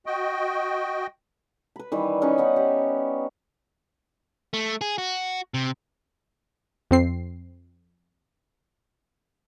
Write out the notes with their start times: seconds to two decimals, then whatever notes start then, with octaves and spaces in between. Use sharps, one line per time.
0.06 F#4 D#5 G5
1.76 B4 B5
1.92 D#3 E3 G3
2.22 C#4 D#4 G4 B4
2.38 B3 D#4 F#5
2.56 G4
4.53 A3
4.81 G#4
4.98 F#4
5.54 C3
6.91 F2 C4 C7